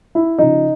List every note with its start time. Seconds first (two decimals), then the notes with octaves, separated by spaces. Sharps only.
0.15 E4
0.38 C#3 F3 D#4